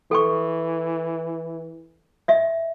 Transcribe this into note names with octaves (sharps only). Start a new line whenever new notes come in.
E3 A4 G5 C#6
D#5 E5